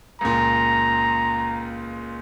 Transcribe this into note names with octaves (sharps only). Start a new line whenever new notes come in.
C#2 A#2 A#5